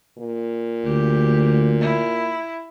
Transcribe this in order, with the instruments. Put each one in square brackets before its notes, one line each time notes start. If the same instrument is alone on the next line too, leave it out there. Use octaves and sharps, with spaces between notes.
[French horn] A#2
[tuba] D2 [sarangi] G4
[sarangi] E4